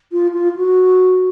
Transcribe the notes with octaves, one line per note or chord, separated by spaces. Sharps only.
F4
F4
F#4